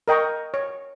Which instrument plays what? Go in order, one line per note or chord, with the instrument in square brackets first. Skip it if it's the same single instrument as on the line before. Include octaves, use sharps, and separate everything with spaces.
[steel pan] A#4 D#5 G5 A#5 C#6
C#5